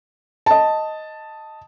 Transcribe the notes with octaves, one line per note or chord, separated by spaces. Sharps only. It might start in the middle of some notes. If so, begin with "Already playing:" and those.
D#5 A5